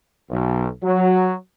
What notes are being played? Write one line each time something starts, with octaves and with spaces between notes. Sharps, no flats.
B1
F#3